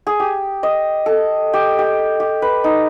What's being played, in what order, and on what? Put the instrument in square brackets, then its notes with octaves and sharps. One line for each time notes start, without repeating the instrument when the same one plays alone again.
[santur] G#4
G4
D#5
A4
G4
G4
G4
B4
D#4